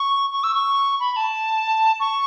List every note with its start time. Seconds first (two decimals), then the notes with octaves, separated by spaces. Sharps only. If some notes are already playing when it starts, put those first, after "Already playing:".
Already playing: C#6
0.32 C#6
0.43 E6
0.54 C#6
1.00 B5
1.16 A5
2.00 C#6